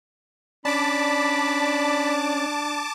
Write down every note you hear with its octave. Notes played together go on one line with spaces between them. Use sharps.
C#4 D4 D5 A5 B5 D6